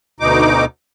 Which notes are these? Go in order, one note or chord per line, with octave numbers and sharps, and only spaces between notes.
D2 B2 D#4 D6